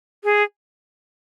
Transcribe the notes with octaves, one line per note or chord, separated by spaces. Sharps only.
G#4